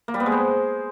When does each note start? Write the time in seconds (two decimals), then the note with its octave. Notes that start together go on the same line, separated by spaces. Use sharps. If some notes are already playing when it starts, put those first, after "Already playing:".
0.08 A#3
0.14 G3
0.20 B3
0.26 G#3
0.32 C5